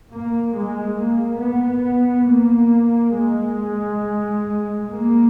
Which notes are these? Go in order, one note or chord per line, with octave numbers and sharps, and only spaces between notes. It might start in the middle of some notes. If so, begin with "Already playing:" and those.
A#3
G#3
A#3
B3
A#3
G#3
A#3